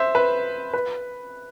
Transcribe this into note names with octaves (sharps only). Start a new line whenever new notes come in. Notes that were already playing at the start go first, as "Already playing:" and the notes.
Already playing: C5 E5
B4
B4